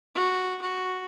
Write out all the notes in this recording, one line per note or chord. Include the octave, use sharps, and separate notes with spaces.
F#4
F#4